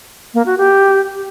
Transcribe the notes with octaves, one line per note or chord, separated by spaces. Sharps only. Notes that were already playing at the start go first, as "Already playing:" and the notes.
A#3
F#4
G4